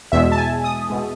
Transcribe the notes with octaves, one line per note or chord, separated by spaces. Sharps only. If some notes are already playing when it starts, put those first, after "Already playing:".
E2 B2 G#3 E5
A5
G#5
D#6
B2 G#3